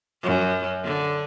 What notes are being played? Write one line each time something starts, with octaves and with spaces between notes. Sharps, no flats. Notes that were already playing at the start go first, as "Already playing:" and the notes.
F#2
D3